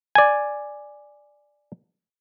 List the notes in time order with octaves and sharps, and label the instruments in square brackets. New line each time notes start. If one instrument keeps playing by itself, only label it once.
[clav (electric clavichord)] D5 G#5